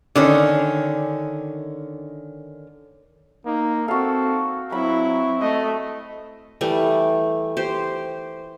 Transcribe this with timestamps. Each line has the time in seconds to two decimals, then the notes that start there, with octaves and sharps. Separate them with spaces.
0.15 D3 D#3 C#4
3.45 A#3 D#4
3.88 C4 F#4 A4 F5
4.72 F#3 C4 E4 B5
5.41 A3 D#5
6.61 E3 G3 A3
7.57 G4 C5